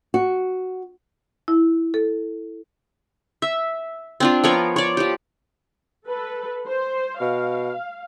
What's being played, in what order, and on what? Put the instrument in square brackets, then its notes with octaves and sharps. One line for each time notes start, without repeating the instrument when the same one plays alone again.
[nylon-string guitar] F#4
[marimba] E4
A4
[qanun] E5
C4 D4 F4
F3 B3 A#4 C#5
C#5 D5
F3 G4
[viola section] A4 B4
C5
[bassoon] B2 [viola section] F5